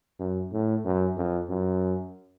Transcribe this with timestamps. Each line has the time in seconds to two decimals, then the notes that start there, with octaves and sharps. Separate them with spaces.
0.20 F#2
0.53 A2
0.85 F#2
1.17 F2
1.49 F#2